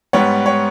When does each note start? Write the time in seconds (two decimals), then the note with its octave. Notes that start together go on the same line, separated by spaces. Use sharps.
0.13 G#2 G3 B3 C#5
0.46 C#5